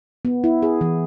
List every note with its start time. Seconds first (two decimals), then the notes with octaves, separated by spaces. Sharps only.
0.25 B3
0.44 E4
0.62 G#4
0.81 E3